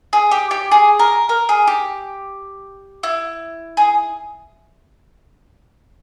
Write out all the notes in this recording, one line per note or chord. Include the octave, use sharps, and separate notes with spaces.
G#4
G4
G4
G#4
A#4
A#4
G#4
G4
E4
G#4